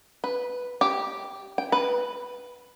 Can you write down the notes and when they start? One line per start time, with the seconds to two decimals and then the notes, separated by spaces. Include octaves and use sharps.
0.24 B4
0.81 G4
1.58 G5
1.72 B4